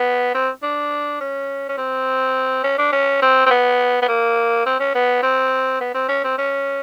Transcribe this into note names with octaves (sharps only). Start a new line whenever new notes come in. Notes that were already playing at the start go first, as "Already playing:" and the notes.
Already playing: B3
C4
D4
C#4
C#4
C4
C#4
D4
C#4
C4
C4
B3
B3
A#3
C4
C#4
B3
C4
B3
C4
C#4
C4
C#4